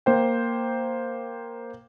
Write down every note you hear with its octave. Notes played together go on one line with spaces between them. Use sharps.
A#3 C5 G5